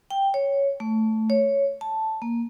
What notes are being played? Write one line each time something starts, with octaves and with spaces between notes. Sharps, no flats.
G5
C#5
A3
C#5
A5
A#3